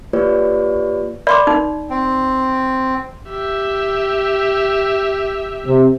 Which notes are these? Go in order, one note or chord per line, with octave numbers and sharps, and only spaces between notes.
A#3 F4 G4 B4 C#5 D5
D5 B5 C6 D6
D#4
C4
G4 E5
C3